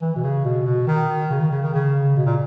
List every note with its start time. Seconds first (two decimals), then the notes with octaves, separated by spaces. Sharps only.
0.02 E3
0.15 B2
0.23 C#3
0.45 B2
0.66 B2
0.87 D#3
1.30 C#3
1.40 D#3
1.51 C#3
1.63 D#3
1.73 C#3
2.17 B2
2.26 A#2